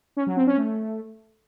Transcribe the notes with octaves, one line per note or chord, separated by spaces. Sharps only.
C#4
F#3
C4
C#4
A3